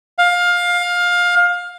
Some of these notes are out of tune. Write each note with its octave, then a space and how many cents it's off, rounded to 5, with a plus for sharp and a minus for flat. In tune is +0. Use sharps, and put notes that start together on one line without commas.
F5 +20